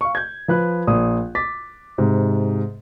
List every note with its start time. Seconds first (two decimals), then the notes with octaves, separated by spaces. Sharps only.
0.01 F5 C#6
0.15 G6 G#6
0.48 F3 B4 F#6
0.87 A#1 A#3 D#6
1.35 D6 A6 B6
1.98 G#2 C3